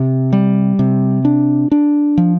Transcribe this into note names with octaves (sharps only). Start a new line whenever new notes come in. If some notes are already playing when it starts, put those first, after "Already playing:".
Already playing: C3
G3
C3
D4
D4
F3